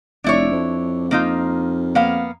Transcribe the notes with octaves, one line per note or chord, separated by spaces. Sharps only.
F1 D4 E4 C#5
F2
A#3 D#4 F4
A#3 B3 F5